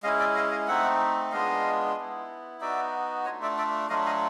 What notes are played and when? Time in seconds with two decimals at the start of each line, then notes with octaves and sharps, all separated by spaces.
0.03 G#3 C#4 E4 D#5 F5
0.19 D5 E5
0.35 D#5 F5
0.51 D#5 F5
0.68 A3 C4 D#4 E5 F#5
1.32 G#3 B3 D4 F4 D#5 F5
1.96 B3 E4
2.61 B3 D#4 F#4 D5 E5
3.25 A3 D4 F4 C#5 D#5
3.42 D5 E5
3.58 D5 E5
3.90 F#3 A3 D4 F4 D#5 F5
4.06 D#5 F5